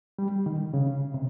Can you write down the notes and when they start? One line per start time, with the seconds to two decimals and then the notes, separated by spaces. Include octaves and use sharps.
0.19 G3
0.46 D#3
0.74 C#3
1.14 C3